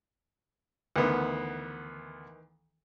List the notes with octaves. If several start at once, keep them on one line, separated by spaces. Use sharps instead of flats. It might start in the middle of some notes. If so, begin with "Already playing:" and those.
D2 D#3 E3 B3